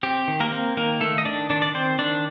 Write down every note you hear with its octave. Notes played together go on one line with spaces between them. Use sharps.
C4 G4
D#3
A#3 A#4
C4
D#3 A#3 A#4
D#3 A3 A4
D#5
D#3 D4 D5
D#3 D4 D5
D5
D#3 C4 C5
D#3 D4 D5